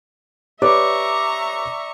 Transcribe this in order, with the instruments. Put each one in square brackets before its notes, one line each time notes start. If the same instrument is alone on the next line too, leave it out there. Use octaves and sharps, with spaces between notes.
[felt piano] G4 B4 C#5 [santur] D5 [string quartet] E5 A#5 C#6